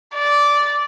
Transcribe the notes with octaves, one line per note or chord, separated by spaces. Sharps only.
D5